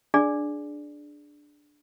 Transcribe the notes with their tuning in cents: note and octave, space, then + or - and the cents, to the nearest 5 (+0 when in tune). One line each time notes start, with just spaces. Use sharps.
D4 +0 G#4 +15 D5 +0